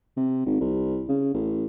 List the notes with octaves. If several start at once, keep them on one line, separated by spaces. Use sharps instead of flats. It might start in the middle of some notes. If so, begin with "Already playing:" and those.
C3
G#1
C2
C#3
A1